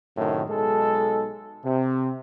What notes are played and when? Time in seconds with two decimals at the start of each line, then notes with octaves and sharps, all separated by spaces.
0.17 F#2 A2 C3 D#3
0.50 B1 G#3 A4
1.65 C3